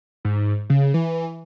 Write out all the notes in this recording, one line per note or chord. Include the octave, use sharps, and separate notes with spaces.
G#2
C#3
E3